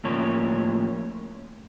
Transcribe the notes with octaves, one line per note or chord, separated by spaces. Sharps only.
A2 F3 A#3 C#4 C#5